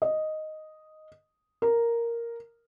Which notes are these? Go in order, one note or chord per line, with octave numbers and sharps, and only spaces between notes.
D#5
A#4